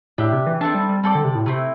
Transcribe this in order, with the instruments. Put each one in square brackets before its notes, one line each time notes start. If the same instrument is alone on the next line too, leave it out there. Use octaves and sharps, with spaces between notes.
[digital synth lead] A2 [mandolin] D4 G4 E5
[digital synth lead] C3
E3
[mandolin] C4 A4 E5 A5 [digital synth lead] D4
[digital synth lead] G3
G3
[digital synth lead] G3 [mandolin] C4 A4 D5
[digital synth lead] D3
C3
A2
[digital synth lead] C3 [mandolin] A3 C4 E4